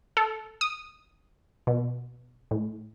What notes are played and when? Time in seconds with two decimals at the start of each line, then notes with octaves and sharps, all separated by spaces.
0.17 A4
0.61 D#6
1.67 B2
2.51 A2